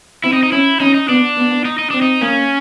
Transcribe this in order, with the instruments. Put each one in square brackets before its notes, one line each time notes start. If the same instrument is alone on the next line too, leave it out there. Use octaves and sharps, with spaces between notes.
[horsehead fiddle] C4 [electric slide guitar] E4
[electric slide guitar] D#4
D#4
[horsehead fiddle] C#4 [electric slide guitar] E4
[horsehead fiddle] C#4 [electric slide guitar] D#4
[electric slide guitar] D#4
[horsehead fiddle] B3 [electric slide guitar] D4
[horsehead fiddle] B3
[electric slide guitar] D#4
D#4
[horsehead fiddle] C4 [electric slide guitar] D4
[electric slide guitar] D#4
[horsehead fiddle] A#3 [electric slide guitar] C#4